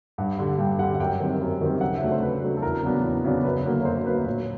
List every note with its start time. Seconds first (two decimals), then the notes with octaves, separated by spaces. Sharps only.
0.18 G2 F#5
0.39 D3 G3
0.58 G2 G5
0.79 D3 G3 F#5
0.94 F#5
1.00 F#2 G5
1.20 D#3 G3 C4
1.41 F#2
1.61 D#3 G3 C4
1.81 C#3 F#5
1.95 E5
2.01 F#3 A3 D4
2.12 C5
2.22 C#3 B4
2.42 F#3 A3 D4
2.57 A4
2.62 E2 A#4
2.83 C#3 F#3 B3 D4
3.04 E2
3.24 C#3 F#3 B3 D4
3.44 F#2 B4
3.65 D3 F#3 A#3
3.81 C#5
3.85 F#2 C5
4.06 D3 F#3 A#3 B4
4.26 A#2 C#5